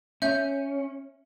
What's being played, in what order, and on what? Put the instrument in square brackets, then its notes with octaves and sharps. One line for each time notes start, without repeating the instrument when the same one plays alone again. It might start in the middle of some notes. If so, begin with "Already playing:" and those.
[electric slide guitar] C#4 [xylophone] E5 G6